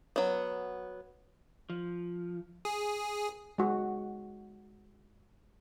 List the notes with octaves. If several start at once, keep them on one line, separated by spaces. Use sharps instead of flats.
F#3 B3
F3
G#4
G#3 F#4